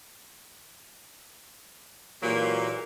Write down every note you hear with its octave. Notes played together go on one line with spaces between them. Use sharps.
A#2 E3 F#3 G#3 A#3 G4